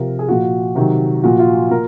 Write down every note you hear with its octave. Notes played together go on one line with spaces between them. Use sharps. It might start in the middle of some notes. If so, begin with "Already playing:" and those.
Already playing: C3 F3 A#4
G#4
A#2 F3 F#4
C3 D#3 F#3
A#2 F3 F#4
F4
A#2 A#4